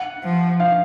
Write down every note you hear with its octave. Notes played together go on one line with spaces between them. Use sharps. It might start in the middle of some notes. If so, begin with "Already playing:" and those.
Already playing: F#5
F3
F5